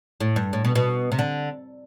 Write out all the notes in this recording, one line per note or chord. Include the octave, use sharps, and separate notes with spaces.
A2
G2
A2
B2
B2
C3
D3